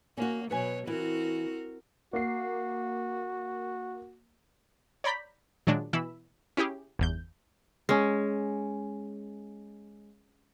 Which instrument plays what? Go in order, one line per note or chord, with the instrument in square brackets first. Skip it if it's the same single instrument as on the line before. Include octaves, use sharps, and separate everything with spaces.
[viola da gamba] A#3 [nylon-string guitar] C#4 F#4
[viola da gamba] B2 F#3 C#5 [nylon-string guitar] B4 G#5
[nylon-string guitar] E3 [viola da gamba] C4 F#4 A#4
[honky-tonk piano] A#3 C7 [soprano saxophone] F#4
[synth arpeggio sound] C#5 D5 A#5 B5 G6 B6
A#2 D#3 F#3 G#3 D4
B2 E3 E4 B5 E6
C#4 E4 G4 G#4
G1 E2 G6
[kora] G#3 C#4